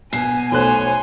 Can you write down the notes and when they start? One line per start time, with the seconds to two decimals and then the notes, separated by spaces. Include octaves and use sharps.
0.13 B2 G#5 C7
0.52 B1 A3 C5 C#5 G#5 F#6